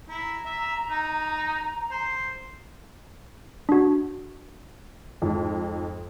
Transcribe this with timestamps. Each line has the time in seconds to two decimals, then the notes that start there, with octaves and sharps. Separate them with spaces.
0.09 E4 A#5
0.46 E5
0.90 D#4
1.91 C5
3.69 D4 F#4
5.22 F2 G#2